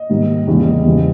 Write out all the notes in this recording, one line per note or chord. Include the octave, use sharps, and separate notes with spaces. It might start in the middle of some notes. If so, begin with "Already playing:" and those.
Already playing: D#5
G#2 D#3 G3 A#3
E2 C#3 G3 A#3 D#4
E2 C#3 G3 B3